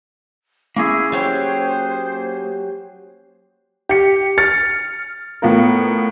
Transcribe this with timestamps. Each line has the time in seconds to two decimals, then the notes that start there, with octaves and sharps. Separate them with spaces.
0.76 A#3 C#4 E4 G#4
1.12 F#3 G4 C5 G5
3.89 G4 C#7
4.38 F6 A6 C#7
5.42 A2 B3 F4 A#4